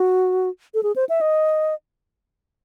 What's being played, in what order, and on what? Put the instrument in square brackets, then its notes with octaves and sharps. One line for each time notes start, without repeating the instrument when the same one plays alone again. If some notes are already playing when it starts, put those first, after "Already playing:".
Already playing: [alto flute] F#4
A4
G#4
C5
E5
D#5